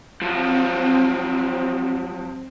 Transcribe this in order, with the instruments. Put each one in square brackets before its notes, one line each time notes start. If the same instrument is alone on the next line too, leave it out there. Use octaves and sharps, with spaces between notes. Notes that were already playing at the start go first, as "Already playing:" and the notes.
[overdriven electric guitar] F3 F#3 [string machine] C4